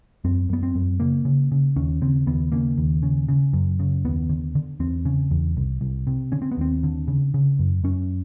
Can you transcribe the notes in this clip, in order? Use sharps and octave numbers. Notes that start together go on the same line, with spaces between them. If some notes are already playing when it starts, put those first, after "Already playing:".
F#2 C4
F#2 B3
C4
F#2
C#3 A#3
C#3
C#3
D#2 C#4
C#3 C4
D#2 B3
C#3 A#3
D#2
C#3
C#3
F#2
C#3
D#2 B3
D3
D3
E2 C4
C#3
E2
C2
C2
C3
D3 C#4
C4
B3
D#2 C4
D3
C#3
C#3
F#2
F#2 C#4